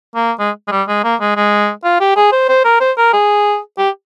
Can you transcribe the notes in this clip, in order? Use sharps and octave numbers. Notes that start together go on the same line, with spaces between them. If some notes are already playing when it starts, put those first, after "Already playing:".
A#3
G#3
G#3
G3
G#3
A#3
G#3
G#3
F4
G4
G#4
C5
C5
A#4
C5
A#4
G#4
G4